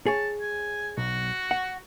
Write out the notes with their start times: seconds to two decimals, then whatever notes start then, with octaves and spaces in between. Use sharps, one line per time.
0.06 G#4 C#5 A5
0.41 G#5
0.98 B1 F#4
1.51 F#5